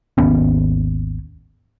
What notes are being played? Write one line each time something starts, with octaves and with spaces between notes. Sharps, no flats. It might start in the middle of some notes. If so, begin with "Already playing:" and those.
G#1 D#2 B3 C#4